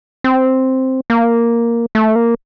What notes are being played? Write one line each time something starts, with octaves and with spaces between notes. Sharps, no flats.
C4
A#3
A3
A#3